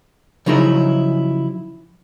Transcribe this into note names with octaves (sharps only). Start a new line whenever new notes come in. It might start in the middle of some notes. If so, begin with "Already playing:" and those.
C#3 F3 F#3 D#4 E4 G#4